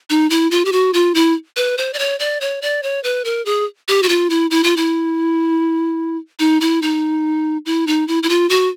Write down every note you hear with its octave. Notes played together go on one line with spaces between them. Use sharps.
D#4
E4
F4
G4
F#4
F4
E4
B4
C5
D5
C#5
D5
C#5
D5
C#5
B4
A#4
G#4
G4
F#4
F4
E4
E4
F4
E4
D#4
E4
D#4
E4
D#4
E4
E4
F4
F#4